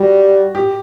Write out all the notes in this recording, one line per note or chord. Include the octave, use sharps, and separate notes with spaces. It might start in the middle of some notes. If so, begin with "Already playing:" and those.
Already playing: G3 F#4
G4